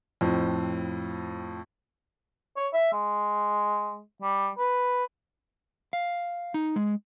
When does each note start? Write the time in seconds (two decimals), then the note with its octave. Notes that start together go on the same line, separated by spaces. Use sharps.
0.21 F2 A2 C4
2.56 C#5
2.73 E5
2.93 G#3
4.22 G3
4.58 B4
5.93 F5
6.54 D#4
6.76 G#3